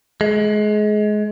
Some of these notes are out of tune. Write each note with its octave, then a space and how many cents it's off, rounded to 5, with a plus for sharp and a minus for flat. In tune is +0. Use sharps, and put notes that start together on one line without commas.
G#3 +25